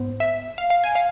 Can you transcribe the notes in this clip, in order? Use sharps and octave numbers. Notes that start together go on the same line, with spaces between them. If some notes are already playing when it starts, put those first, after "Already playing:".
Already playing: G#2 B3 C5
E5
F5
F5
G#5
F5